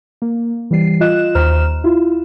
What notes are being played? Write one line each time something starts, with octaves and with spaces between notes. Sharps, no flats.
A#3
E3 G3 C7
F4 D#5 F#6 E7
D#2 C5 A#5 F6 E7
E4 F4